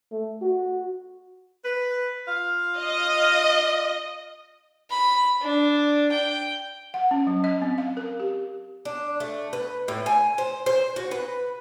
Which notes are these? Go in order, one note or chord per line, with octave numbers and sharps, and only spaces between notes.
A3
F#4
B4
F4 F5
D#5
B5
D4
G5
F#5
C#4
F#3
D#5
C4
F5
A#4
G4
D4
A3
B4
A2
G#5
C5
C5
F#4
B4